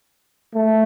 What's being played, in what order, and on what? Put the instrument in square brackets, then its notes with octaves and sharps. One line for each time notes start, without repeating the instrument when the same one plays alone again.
[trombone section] A3